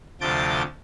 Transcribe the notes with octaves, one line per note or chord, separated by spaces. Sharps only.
D2 C3 F3 D6 G6 A6